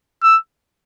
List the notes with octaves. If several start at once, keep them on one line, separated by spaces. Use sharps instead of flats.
E6